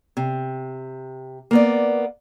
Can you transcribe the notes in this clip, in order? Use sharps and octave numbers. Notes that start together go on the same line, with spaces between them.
C3
A#3 B3 D5